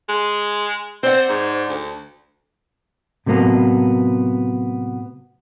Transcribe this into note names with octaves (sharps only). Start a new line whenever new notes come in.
G#3
C4 C5 D5 F#5
G#2
D2
A2 C3 F#3 A#3 B3